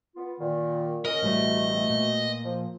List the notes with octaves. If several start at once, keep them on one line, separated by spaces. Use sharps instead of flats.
B3 F4
A#2 D#3
C#4 A#4 D#5
A1 B2 G3 A3
A#2
F3